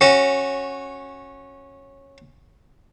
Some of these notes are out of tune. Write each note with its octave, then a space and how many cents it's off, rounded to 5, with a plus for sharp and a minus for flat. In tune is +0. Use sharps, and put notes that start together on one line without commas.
C#4 -15 F#4 +0